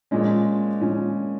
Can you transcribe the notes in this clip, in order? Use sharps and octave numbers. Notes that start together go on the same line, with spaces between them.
A#2 F3 G#3 C#4
A#2 F3 G#3 C#4